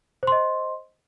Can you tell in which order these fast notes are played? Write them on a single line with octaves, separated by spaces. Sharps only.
C5 C6 D#5